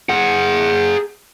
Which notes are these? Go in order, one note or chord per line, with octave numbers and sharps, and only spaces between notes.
G#4 F#5